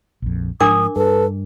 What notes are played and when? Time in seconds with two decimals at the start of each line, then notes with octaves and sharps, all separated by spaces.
0.22 A#1 F2
0.61 G#2 F3 D4 A#4 D6 D#6
0.96 G2 A4 B4